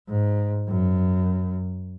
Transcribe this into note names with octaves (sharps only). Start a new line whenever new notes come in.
G#2
F#2